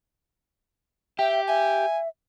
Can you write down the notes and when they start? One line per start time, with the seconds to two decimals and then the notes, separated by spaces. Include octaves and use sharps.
1.19 G4 E5 G5
1.48 E5 G#5